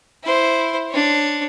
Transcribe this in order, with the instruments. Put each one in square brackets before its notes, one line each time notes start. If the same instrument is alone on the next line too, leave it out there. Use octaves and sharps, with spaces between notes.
[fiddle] E4 C5
D4 C#5